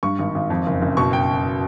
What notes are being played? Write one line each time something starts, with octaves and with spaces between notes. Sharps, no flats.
G2 C#6
G#1
G#1
F2
F#1
F#1
B2 C#6
G5